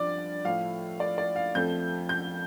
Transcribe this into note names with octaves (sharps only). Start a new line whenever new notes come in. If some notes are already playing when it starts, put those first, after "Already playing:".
Already playing: G2 F3 D5 D6
A2 F3 A3 F5
D5
D5
F5
F2 F3 A3 G6
G6